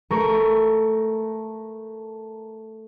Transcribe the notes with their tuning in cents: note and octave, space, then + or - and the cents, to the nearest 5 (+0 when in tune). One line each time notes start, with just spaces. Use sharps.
A3 +0 A#4 +5 C#6 +20